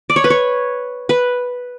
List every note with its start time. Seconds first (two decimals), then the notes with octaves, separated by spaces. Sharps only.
0.10 D5
0.16 C#5
0.24 B4
0.30 C#5
1.09 B4